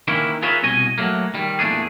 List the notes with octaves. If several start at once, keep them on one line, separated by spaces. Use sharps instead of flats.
D#3 E3 A#3 C#4 E4
F4 G#4 A#4 B4 C#5 E5
C2 B2 C#5 D#5 G#5
F#3 A3 A#3
D#3 G3
E2 A#2 A3 D4 G#4